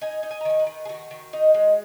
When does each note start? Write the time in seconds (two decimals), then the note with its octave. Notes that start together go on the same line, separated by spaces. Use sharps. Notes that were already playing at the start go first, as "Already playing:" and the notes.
0.01 D#4 G#5
0.23 D#4
0.31 G#5
0.41 A#5
0.45 D#3 G#5
0.59 B4
0.67 D#3
0.85 G#4
0.89 D#3 F#4
1.11 D#3
1.33 D#4
1.54 G#3